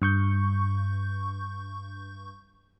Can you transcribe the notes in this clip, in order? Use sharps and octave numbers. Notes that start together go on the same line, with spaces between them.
G2 C#6 G6